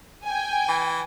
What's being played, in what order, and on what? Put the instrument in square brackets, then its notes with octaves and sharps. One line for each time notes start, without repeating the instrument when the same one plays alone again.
[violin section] G5 G#5
[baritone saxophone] E3